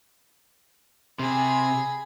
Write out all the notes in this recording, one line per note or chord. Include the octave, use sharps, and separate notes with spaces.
C3 G#4 B5